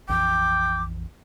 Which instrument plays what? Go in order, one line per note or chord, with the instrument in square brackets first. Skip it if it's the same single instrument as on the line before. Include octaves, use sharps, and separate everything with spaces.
[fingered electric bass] A#1 F2 E3 [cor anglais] G5 [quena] D6